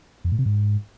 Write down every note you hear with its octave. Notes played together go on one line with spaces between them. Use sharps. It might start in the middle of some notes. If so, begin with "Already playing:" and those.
F2
A2
C3
G#2